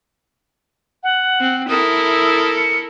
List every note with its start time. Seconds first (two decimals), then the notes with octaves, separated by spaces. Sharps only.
1.03 F#5
1.40 C4
1.69 E4 A4 A#4 D#6
2.57 C#7